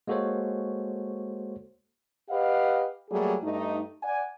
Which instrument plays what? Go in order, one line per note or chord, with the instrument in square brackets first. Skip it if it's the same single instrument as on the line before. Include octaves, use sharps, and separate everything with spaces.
[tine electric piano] G#3 A#3 F#4 A4 C5 C#5
[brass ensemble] G4 B4 D#5 F5 F#5
F#3 G3 A3 A#3 G#4
G2 A3 D#4
D5 F#5 G#5